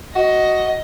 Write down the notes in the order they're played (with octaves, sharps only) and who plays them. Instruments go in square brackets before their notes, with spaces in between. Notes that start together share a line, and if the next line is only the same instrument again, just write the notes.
[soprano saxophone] F#4 [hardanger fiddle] D#5